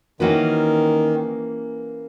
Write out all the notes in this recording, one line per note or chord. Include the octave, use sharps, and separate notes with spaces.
D#3 E3 A#3 C#4 F#4 B4